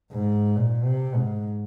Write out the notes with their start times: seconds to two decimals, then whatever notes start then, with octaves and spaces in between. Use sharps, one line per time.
0.12 G#2
0.56 A#2
0.85 C3
1.15 G#2